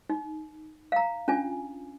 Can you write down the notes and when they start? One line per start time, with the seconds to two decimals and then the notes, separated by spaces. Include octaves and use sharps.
0.10 D#4
0.92 F5 A#5
1.28 C#4 D4 F4 G#5